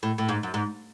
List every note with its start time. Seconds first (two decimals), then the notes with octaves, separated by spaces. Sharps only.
0.03 A2
0.18 A2
0.29 G#2
0.43 F#2
0.54 G#2